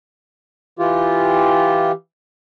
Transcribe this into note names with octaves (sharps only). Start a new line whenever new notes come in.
E3 F4 G4